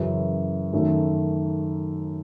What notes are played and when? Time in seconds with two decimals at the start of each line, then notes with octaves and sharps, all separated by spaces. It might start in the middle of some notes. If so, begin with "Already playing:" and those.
Already playing: F#2 C#3 E3
0.73 F#2 D#3 A3